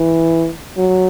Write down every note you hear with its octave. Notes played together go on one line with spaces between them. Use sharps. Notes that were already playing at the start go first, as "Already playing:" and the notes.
Already playing: E3
F#3